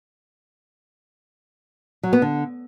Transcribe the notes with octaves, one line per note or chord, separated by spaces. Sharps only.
F#3
B3
D3